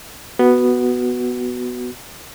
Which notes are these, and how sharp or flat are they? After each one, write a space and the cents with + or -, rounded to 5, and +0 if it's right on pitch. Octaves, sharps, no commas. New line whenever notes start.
B3 +0 F#4 +5